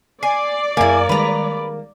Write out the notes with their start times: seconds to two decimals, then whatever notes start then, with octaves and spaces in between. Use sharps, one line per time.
0.23 D5 G#5 C7
0.77 F#2 A#3 E4 G#4 A#4 G#5
1.09 D#3 G3 G#3 B4 A#5